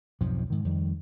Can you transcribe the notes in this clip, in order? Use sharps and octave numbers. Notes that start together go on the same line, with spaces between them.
B1 F2 G#2 F3
G#2 D#3
F2 D#3 G3